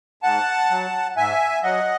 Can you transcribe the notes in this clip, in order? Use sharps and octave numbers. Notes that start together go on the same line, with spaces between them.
G#2 F#5 A5
F#3
G#2 E5 G#5
F#3 D#5 F#5